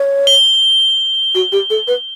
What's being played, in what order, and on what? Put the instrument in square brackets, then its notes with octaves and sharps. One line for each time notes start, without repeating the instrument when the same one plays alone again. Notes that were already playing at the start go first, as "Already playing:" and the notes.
Already playing: [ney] C#5
[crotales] G7
[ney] F#4
G4
A4
B4